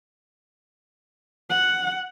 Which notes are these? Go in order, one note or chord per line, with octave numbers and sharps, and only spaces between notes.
F#5